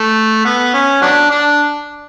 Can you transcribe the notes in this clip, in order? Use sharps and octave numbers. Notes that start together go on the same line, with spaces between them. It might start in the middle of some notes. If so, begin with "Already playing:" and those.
Already playing: A3
B3
C#4
F#3 B3 D4
D4